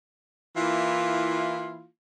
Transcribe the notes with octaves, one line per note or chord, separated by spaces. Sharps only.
E3 A#3 E4 F4